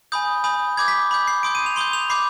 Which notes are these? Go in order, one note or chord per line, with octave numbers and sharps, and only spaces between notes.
G#5 B5 D#6 G6
G#5 B5 D#6 G6
B5 D6 G6 G#6
B6
B5 D6 G6
C7
C6 D#6 G6 D7
D#7
F7
C6 D#6 G6 G7
F7
B5 D6 G6 C7